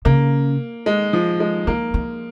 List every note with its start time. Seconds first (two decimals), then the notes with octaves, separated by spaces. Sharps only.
0.05 C#3 A#3
0.86 G#3
1.13 F3
1.40 G#3
1.67 D#3 A#3
1.94 D#3